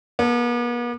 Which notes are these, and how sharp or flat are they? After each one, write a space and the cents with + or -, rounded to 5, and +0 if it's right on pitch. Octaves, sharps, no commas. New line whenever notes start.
B3 -45 A4 +15